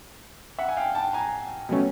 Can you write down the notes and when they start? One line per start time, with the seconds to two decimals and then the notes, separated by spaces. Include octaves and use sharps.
0.59 E5 F#5
0.69 G#5
0.77 F5 G5
0.95 G5 A5
1.13 G#5 A#5
1.69 B2 F#3 A3 C#4